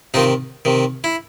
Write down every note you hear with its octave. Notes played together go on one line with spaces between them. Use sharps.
C3 D#3 D#4 F4
C3 D#3
E4